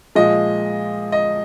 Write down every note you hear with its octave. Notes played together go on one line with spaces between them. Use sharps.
A#2 F3 G#3 D#5
D#5